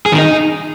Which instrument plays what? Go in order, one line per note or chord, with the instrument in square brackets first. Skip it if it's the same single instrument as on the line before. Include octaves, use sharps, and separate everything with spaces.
[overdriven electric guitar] G#4
D#3
D#4